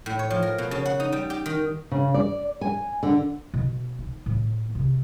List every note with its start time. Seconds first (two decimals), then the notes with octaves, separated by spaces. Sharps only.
0.06 A2
0.19 C#5
0.30 F3
0.43 A#4
0.58 B2
0.71 C#3
0.86 F#5
1.00 D#4
1.12 G3
1.30 G4
1.46 D#3
1.91 C#3
2.14 D5
2.61 G#5
3.03 D3
3.54 B2
3.99 D#4
4.26 A2
4.75 C3